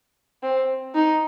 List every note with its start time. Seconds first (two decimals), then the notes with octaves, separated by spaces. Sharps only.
0.43 C4
0.95 D#4